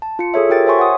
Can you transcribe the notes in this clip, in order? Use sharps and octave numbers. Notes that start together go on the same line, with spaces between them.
A5
F4 C#7
G#4 A4 C#5 E5
F4 G4 A#4 G5 A6
C5 C#5 E5 G#5 C6 C#6
F#5 D#6